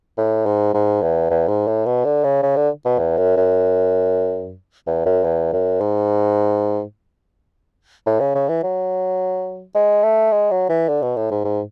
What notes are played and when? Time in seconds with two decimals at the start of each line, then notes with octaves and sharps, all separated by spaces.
0.17 A2
0.46 G#2
0.74 G#2
1.02 E2
1.30 E2
1.48 G#2
1.67 A2
1.86 B2
2.05 D3
2.24 C#3
2.43 C#3
2.56 D3
2.85 B2
2.98 E2
3.17 F#2
3.37 F#2
4.87 E2
5.06 F#2
5.24 E2
5.53 F#2
5.80 G#2
8.06 A2
8.20 C#3
8.35 C#3
8.49 E3
8.63 F#3
9.75 G#3
10.03 A3
10.32 G#3
10.51 F#3
10.69 E3
10.88 D3
11.02 B2
11.16 A2
11.31 G#2
11.44 G#2